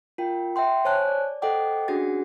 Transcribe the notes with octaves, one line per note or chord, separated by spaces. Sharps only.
F4 A#4 G5
E5 F#5 G5 C6
C5 C#5 G#5 A5 F#6
D5
A4 C5 D#5 F#5 G5 D6
C#4 D4 F#4 G#4 F#5 A6